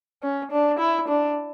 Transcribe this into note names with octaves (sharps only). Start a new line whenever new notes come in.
C#4
D4
E4
D4